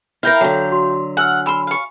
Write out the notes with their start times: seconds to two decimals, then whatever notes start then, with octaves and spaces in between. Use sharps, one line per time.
0.23 E4 A#4 F5 G5 A#5 F6
0.41 D3 F#3 A4
0.72 F#4 C6
1.17 F#5 G#5 E6 F6
1.46 G#5 B5 C6 E6 F6
1.67 F5 C#6